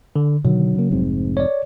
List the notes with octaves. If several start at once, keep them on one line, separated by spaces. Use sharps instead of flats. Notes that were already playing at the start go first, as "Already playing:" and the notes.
D3
B2 D3 D#3 F#3
C#3 A#3
F1 G#2 C4
C#5 D5